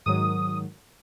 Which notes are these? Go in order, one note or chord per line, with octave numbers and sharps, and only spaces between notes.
G#2 D#3 F#3 D#6